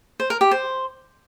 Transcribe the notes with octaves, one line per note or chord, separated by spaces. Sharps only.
C5
A#4
G4
C5